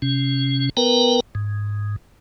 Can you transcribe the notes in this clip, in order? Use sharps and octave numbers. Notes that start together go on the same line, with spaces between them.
C3 C#4
B3 A#4 B4 G5 A#5
G#2